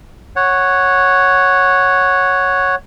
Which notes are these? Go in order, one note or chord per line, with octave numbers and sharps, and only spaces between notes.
C#5 F#5